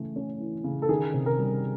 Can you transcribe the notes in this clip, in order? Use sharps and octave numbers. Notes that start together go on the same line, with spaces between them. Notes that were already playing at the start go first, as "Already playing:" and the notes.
Already playing: C#3 E3 A3
C#4
E3
C#3
A4
D#3 G#4
C3
A#4
G3